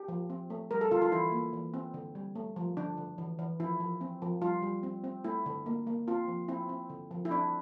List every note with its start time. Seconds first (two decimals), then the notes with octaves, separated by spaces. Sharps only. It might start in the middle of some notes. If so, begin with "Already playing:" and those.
Already playing: G4
0.08 F3
0.30 C4
0.50 A3
0.71 G3 A#4
0.81 A4
0.91 D3 F4
1.02 F4
1.12 E3 E4
1.32 A#3
1.53 E3
1.74 C4
1.94 D3
2.15 G3
2.36 A3
2.56 F3
2.77 D3 D4
2.97 D3
3.18 E3
3.39 E3
3.60 F3 E4
3.80 F3
4.01 C4
4.22 F3
4.42 G3 F4
4.62 G3
4.83 C4
5.04 C4
5.24 A3 E4
5.46 D3
5.66 A#3
5.87 A#3
6.07 C4 F4
6.28 F3
6.48 C4 E4
6.69 C4
6.90 D3
7.11 F3
7.25 E4
7.31 C4 D4